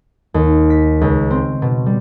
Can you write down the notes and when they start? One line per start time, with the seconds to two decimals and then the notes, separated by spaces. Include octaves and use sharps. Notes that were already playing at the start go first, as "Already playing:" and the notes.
0.34 D#2
0.70 B6
1.01 C#2
1.30 C4
1.62 B2
1.86 G3